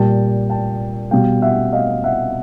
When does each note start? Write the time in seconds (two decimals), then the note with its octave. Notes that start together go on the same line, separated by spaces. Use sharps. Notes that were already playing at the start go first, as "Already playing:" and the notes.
Already playing: A#2 G3 G5 A5
0.50 G5 A5
1.11 B2 G3 F5 G5
1.42 E5 F#5
1.73 D#5 F5
2.04 E5 F#5